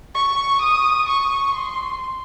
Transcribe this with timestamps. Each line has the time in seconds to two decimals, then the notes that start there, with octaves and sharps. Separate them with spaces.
0.15 C#6
0.61 D#6
1.08 C#6
1.54 C6